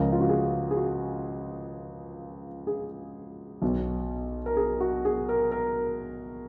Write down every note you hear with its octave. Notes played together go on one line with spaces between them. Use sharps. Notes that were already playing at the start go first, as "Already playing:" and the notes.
Already playing: C#2 C#3 F3 A#4
F4
F#4
G#4
G#4
F#4
G#4
B1 B2 F#3
A#4
G#4
F#4
G#4
A#4
A#4